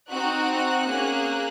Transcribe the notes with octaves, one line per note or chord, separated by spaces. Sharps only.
C4 D#4 F#4 F#6
A#3 C#4 G#4